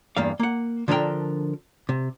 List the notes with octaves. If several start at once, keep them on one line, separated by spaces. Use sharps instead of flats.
E2 G2 A#3 F5
A#3 F#5
D3 F3 D4 A4 A#4 G5
C3